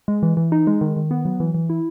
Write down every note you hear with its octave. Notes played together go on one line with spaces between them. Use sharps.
G#3
E3
E3
D#4
G#3
D#3
D#3
B3
F#3
E3
E3
E4